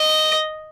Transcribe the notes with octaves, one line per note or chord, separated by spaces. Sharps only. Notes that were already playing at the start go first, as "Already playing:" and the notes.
Already playing: D#5